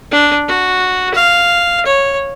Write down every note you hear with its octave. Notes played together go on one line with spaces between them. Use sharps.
D4
F#4
F5
C#5